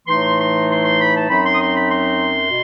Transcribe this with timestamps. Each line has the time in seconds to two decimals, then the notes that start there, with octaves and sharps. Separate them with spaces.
0.07 A2 E3 A3 D#4 C6
0.38 C6
0.68 C6
0.83 C6
0.98 B5
1.13 A5
1.28 F#2 F#3 C4 D#4 B5
1.43 C6
1.53 D#6
1.58 C6
1.73 B5
1.88 C6
2.48 B2